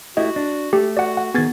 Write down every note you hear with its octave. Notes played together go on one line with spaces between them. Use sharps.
A3 E4 F#4 G4 D#5
D4
A3 G4
F#4 D5 F#5
F#5
D#3 B3 G#4 G#6 A6